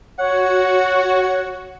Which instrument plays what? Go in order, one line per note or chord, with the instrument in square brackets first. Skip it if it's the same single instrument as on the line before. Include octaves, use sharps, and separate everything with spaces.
[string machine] F#4 [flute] C#5 [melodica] F#5